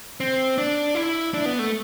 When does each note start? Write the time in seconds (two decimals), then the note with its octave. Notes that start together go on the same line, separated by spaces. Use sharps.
0.20 C4
0.58 D4
0.95 E4
1.34 D4
1.46 B3
1.59 A3